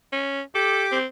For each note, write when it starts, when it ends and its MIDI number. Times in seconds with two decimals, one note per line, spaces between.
0.12 0.41 61
0.55 0.98 67
0.55 0.84 69
0.55 0.98 86
0.92 1.05 60